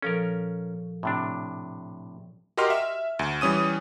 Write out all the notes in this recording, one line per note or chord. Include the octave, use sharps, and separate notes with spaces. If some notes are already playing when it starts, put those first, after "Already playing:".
A#2 F3 C#4 A4 A#4
A2 C3 D4
F#4 G4 A#4 D#5 C6 F6
E5
D2
E3 G3 C#4 D#6 D#7